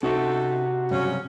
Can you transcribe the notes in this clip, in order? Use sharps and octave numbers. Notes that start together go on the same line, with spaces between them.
C3 C#4 D#4 F#4 A4 E5
G2 C#3 F#3 C#4